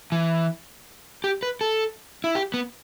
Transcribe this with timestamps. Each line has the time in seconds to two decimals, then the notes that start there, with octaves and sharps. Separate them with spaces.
0.12 E3
1.24 G4
1.43 B4
1.61 A4
2.24 E4
2.35 G4
2.54 B3